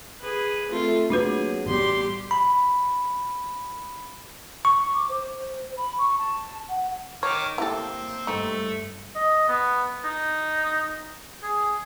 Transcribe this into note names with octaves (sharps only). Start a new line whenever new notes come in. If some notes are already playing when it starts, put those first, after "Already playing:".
G#4 B4
A3 C4 F4
F#3 A3 A#3 D4 F#4 G#4 B4
A1 G3 B3 G4 C6
B5
C#6
D6
C5
B5
C#6
A5
F#5
D#3 C#5 D6 F6
A#3 C4 E4 G4 A4
G2 A3 D#4
D#5
B3
D#4
G#4